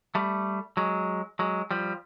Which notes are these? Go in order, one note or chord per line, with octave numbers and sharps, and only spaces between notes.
G3 A3
F#3 G#3
F#3 G#3
F3 G3